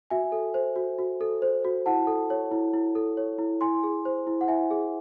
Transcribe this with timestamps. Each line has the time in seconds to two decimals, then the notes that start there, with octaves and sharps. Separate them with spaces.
0.10 F#4 E5 G#5
0.32 A4
0.54 C5
0.76 F#4
0.98 F#4
1.21 A4
1.42 C5
1.65 F#4
1.86 E4 F#5 A5
2.07 A4
2.30 C#5
2.51 E4
2.73 E4
2.95 A4
3.17 C#5
3.38 E4
3.61 E4 G#5 C6
3.83 G#4
4.05 C5
4.27 E4
4.41 F#5
4.48 E4 E5 G#5
4.71 G#4